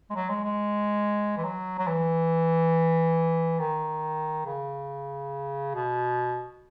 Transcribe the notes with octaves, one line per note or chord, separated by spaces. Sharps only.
G#3
F#3
G#3
G#3
E3
F#3
F#3
E3
D#3
C#3
B2